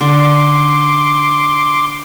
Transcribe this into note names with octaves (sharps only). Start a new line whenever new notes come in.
D3 C6 D6